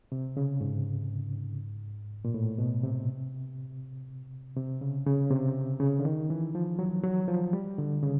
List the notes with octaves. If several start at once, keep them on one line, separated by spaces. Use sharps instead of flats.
C3
C#3
G#2
A#2
A2
B2
C3
C3
C#3
C#3
C3
C#3
D3
D#3
E3
F3
F#3
F#3
F3
G3
D3
C#3